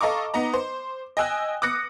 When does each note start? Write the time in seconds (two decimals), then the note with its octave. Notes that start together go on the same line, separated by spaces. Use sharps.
0.01 A4 D#5 F5 A#5 C#6 D6
0.34 B3 D#4 D#5 A#5
0.54 C5
1.17 D#5 G5 G#5 E6 F#6
1.62 D6 D#6 F#6 A#6 C#7